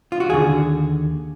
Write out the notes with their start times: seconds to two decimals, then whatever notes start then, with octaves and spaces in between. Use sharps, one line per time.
0.12 F4
0.20 F#4
0.29 D#2 D3 G#4